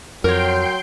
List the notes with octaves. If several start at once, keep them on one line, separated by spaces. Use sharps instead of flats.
F2 F#3 A#4 C#5 G5 C6 G6